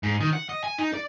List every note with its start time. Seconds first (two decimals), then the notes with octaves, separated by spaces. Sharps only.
0.03 G#2
0.20 D#3
0.33 F#5
0.49 D#5
0.64 G#5
0.78 D#4
0.94 D5